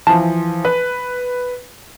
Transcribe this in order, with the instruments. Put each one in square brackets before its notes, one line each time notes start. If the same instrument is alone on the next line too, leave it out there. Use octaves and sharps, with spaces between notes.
[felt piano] E3 F3 [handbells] A5
[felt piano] B4